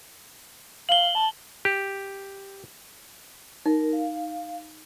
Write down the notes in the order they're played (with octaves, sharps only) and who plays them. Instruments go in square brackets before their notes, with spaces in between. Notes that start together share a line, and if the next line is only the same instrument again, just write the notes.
[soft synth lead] F5 [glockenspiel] F#7 G7
[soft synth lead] A5
[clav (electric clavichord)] G4
[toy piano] D#4 [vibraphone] A#4
[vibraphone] F5